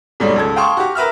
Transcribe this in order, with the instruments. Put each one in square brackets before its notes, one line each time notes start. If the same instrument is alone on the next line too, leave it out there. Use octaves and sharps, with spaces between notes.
[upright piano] G#2 B2 F#3 G3 A3
C#2 A4 G#6
F5 G5 A5 C6 C#6 D#6
F#4 G4
A#4 B4 E5 F6